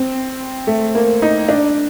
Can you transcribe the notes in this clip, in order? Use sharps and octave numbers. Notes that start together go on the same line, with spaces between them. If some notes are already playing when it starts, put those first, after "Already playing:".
Already playing: C4
A3
A#3
D#4
D4